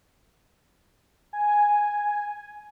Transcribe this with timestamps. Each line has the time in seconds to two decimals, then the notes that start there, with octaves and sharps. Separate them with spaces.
1.33 G#5